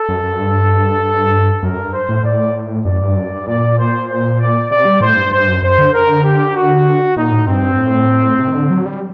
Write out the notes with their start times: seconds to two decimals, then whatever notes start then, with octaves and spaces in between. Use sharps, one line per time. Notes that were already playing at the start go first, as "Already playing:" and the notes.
Already playing: A4
0.09 F#2
0.24 F#2
0.39 G2
1.63 F#2 A#4
1.79 G2
1.93 C5
2.09 A2
2.24 A2 D5
2.85 F#2 D5
3.02 G2
3.17 F#2
3.31 G2
3.47 A#2 D5
3.78 C5
4.08 C5
4.40 D5
4.71 C3 D5
4.85 G3
5.01 A2 C5
5.17 G2
5.31 G2 C5
5.48 F#2
5.62 F#2 C5
5.78 D3
5.93 D3 A#4
6.24 G4
6.55 F#4
7.17 A#2 D#4
7.32 A2
7.47 G2 C4
7.62 G2
7.78 A2
8.39 C3
8.47 D#3
8.55 D3
8.70 F#3
8.85 G3